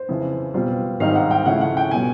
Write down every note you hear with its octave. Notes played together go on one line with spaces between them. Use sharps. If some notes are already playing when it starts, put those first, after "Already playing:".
Already playing: C5
F2 C#3 E3
B2 G3 C4 F4
G#2 D#3 G3 C4 D#4 F5
F#5
G5
C#3 F3 A3 C#4 E4 F#5
F#5
G5
B2 G3 G#5